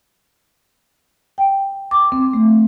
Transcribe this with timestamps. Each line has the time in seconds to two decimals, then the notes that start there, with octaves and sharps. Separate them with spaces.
1.38 G5
1.91 D6
2.12 C4
2.34 A3